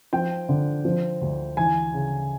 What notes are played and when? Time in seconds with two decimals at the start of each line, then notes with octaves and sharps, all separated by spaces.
0.13 F3 G5
0.49 D3
0.85 F3
1.21 D2
1.57 E3 G#5
1.93 C#3